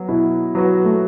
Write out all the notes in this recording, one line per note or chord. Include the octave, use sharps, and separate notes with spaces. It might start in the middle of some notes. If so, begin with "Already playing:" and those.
Already playing: F#3 B3 F#4
B2 E4
F#3 B3 F#4
A3